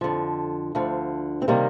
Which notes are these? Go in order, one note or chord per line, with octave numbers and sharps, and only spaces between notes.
F2 D3 F3
D2 D3 F3
C4
C3 D#3 G3 A#3